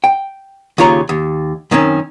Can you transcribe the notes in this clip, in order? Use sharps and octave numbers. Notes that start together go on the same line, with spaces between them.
G5
D#2 C#3 F4 C#5 A#5
D#2
F#2 D#3 C4 C#4